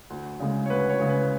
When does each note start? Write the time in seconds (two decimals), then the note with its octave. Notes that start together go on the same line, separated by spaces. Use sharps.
0.10 D2
0.40 C#3 G#3
0.66 C#5
0.70 D2 B4
0.89 C#5
0.99 C#3 G#3
1.09 B4